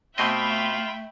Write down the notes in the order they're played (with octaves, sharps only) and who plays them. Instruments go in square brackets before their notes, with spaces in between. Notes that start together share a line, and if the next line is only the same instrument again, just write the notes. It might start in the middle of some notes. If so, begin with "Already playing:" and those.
[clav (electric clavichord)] B2 C4 D#5 [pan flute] A3 [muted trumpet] F4 [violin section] E5 G5 B5